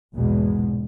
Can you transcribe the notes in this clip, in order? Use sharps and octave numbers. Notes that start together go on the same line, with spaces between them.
A#1 E2 G#2 B2 G#3